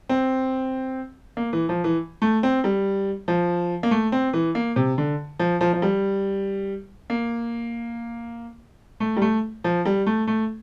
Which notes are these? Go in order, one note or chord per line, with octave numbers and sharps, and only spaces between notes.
C4
A#3
E3
F3
E3
A3
C4
G3
F3
A#3
A3
C4
E3
A#3
C3
D3
F3
F3
F3
G3
A#3
A3
G3
A3
F3
G3
A3
A3